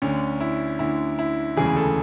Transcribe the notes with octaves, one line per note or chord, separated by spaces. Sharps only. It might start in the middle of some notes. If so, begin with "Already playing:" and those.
D2 D3 C#4
E4
D2 D3 E4
E4
E1 D2 C#3 E3 G#4
A4